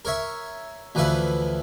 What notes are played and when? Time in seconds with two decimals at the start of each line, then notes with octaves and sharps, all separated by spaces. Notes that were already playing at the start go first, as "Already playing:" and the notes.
0.05 A#4 C#5 E5
0.95 D2 E3 F3 B4 E5